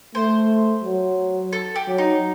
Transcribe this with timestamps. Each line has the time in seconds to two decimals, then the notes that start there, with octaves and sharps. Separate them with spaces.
0.15 A3 C5
0.84 F#3
1.53 A4
1.76 G4
1.87 F#3
1.98 D#4